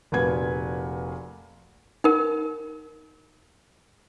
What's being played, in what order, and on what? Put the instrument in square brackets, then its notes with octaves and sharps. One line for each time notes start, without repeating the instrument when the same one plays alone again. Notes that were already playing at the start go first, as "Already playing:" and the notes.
[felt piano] F1 A#2 F#4 B4 G#6
[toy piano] D#4 A#4